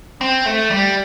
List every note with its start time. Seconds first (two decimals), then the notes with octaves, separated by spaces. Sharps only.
0.21 C4
0.46 A3
0.71 G3